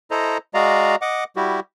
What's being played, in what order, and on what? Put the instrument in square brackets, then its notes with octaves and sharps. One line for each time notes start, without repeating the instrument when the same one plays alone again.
[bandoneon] E4 A4 C5 D#5 A#5
G#3 F#4 D5 D#5 F5 A#5
D#5 F#5 D6
G3 E4 F#4 G4